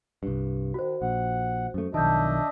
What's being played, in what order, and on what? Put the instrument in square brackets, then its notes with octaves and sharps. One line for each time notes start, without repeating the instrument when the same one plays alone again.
[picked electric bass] C2 G2
[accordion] D#3 [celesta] F#4 C5
[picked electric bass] A#1 [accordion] F#5
[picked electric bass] F#2 A3
[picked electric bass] B1 F2 D#3 [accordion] D4 D#5 E5 [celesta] A5 G6